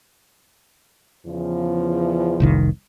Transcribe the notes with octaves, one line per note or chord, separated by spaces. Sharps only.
E2 C#3 F3
F1 C2 D#3